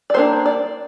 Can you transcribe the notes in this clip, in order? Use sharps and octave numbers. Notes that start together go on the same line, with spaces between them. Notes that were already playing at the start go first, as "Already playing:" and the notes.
D5
D#3 A#3 D4 C5
D5